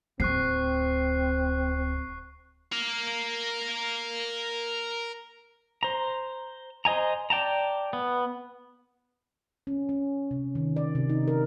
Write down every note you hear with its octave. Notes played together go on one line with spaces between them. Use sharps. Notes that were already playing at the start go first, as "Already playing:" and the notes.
D1 C4 C#6 F#6 C7
A#4 F5
C5 A#5
C5 D#5 G#5 A#5
D5 G5 A5 A#5
B3
C#4
C#4
C3
D#3
D5
C3
D#4
A#4